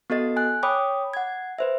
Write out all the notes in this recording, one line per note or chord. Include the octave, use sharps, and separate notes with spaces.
B3 F#4 A4 D#5 A6
G#5 F#6
C#5 G5 B5 D6 D#6
F#5 G#6
B4 C5 E5